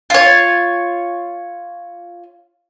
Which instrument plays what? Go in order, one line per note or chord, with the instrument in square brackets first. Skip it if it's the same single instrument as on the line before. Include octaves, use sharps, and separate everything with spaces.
[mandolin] F4 C#5